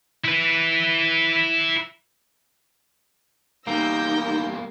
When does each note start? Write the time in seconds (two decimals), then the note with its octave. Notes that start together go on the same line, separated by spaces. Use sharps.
0.25 E4 B4
3.67 E2 G3 A#3 D#4 E6 G6 A#6